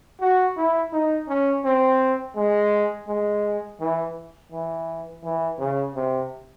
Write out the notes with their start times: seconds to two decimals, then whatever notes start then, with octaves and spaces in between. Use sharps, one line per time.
0.21 F#4
0.57 E4
0.93 D#4
1.28 C#4
1.65 C4
2.36 G#3
3.07 G#3
3.80 E3
4.52 E3
5.23 E3
5.59 C#3
5.95 C3